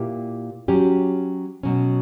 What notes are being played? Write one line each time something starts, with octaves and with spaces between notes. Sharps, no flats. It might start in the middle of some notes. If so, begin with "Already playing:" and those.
Already playing: A#2 A#3 E4 G4
F#3 C#4 G4
B2 F#3 C#4